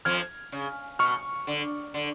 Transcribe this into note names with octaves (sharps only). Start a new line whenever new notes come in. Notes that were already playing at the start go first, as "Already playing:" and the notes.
F2 F3 F6 G#6
C#3
B2 C#6 F6
D3
D3